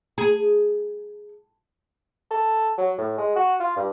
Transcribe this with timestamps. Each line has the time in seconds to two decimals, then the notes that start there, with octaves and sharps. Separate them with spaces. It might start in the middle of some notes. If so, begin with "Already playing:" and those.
0.18 G#4
2.31 A4
2.78 F#3
2.98 A2
3.18 G#3
3.36 F#4
3.60 F4
3.76 G2